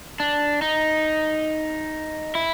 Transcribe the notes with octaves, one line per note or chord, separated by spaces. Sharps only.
D4
D#4
E4